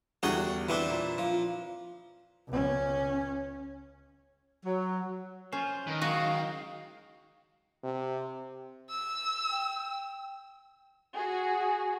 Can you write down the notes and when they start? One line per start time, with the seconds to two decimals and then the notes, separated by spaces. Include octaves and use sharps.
0.23 E2 D3 G3 F#4 G#4 G5
0.69 E3 C4 D4
0.90 A#2
1.18 F3
2.48 C#2 C#4
4.65 F#3
5.53 C#4 F4 C5
5.87 D#3 D#4 A#4 B4
6.02 F#3 G#3 F#4 G#4 F5
7.84 C3
8.90 E6
9.51 G5
11.15 F#4 G#4